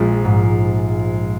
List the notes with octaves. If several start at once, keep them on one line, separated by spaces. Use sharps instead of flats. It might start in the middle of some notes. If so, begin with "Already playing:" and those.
Already playing: A#1 F3 G#3
G#2